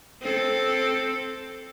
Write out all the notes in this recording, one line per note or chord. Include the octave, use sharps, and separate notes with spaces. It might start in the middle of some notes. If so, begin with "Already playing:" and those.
C4 A4